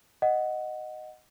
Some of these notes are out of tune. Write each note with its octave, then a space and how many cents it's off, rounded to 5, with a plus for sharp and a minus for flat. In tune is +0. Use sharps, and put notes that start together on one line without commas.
D#5 -5 F#5 +0